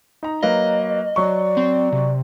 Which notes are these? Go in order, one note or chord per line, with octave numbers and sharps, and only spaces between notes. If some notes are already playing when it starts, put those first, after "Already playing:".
D#4 A#5
F#3 A#3 B4 D#5
F#3 D5 C#6
C4
C3